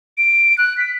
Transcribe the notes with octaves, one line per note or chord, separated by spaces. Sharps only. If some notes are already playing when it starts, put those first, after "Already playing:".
D7
F#6
B6